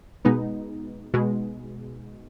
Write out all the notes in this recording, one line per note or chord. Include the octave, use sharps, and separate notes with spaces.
B2 G#3 B3 D#4
B2 G#3